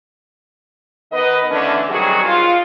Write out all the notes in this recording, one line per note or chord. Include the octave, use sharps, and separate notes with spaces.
D#3 B3 A#4 B4 D#5
D3 E3 A3 C#4 D4
C3 D#3 F#3 G3 F#4 G#4
F4